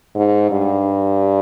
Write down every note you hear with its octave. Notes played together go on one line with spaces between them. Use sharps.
G#2
G2